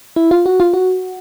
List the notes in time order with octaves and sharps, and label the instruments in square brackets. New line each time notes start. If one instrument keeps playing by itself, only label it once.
[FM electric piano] E4
F4
F#4
F4
F#4